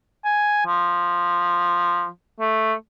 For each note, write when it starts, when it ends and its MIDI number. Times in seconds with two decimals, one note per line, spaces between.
0.25 0.65 80
0.66 2.08 53
2.40 2.74 57